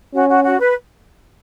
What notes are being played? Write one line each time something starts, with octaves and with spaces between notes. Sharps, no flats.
C#4 F#4
F#4
F#4
B4